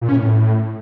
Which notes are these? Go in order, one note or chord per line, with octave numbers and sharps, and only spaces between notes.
A#2
C#4
A2